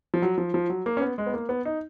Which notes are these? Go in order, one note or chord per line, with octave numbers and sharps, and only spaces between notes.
F3
F#3
F3
F3
F#3
A#3
C#4
B3
G#3
B3
A#3
B3
D#4